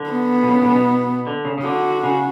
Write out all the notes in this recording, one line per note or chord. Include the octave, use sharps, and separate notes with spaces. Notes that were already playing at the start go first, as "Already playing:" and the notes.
Already playing: D3
B3
B2
C#3
A2
C#3
B2
D3
C#3
C#3
D3 F#4
C#3